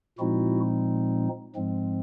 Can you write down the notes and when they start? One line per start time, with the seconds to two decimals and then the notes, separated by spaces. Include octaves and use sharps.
0.19 A#2 F3 G#3 C4 D#4 E4 F#4
1.55 G#2 F3 G#3 C4